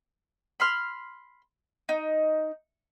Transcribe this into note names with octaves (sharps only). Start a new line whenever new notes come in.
B5 C6 F6
D#4